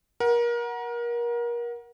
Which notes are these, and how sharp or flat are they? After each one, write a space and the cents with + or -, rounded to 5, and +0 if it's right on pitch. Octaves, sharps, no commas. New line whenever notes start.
A#4 +30 F#5 +0